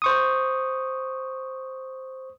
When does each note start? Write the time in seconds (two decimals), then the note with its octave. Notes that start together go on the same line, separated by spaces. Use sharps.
0.02 C5 C#6 D#6